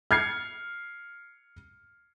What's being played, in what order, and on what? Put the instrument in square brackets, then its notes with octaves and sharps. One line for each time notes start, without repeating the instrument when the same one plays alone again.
[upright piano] F6 G#6 C7 C#7